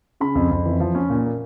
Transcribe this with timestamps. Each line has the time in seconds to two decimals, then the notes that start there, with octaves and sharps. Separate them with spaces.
0.20 C#3 B5
0.35 F2
0.51 F2
0.66 E3
0.80 F3
0.95 C#4
1.10 A#2
1.25 A#3